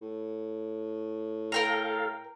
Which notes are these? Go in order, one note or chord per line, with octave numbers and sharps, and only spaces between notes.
A2
A4 A#4 F5 G5 A#5